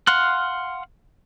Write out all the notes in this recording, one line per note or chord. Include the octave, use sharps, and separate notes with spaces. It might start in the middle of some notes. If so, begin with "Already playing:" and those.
F5 F#5 C6 F6 F#6